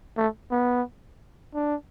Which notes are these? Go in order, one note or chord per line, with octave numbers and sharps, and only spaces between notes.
A3
B3
D4